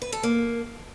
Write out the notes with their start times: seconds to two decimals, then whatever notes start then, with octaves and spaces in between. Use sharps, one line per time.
0.02 B4
0.12 A4
0.23 A#3